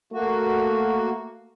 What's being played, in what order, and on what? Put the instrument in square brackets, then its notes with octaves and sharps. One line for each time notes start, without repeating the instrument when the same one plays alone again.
[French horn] A3 [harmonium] A#3 F#4